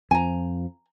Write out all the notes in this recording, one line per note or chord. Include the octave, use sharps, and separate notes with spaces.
F2 F3 G#5 A#5